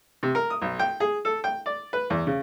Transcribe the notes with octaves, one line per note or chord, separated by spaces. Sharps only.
C3
A#4
D#6
B1
G5
G#4
A4
G5
D5
B4
E2
C#3